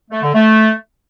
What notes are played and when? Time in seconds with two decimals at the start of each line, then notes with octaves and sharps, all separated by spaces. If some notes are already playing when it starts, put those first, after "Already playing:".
0.11 A3
0.22 D3
0.34 A3